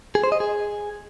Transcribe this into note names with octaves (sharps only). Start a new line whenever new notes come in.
G#4
C5
D#5
G#4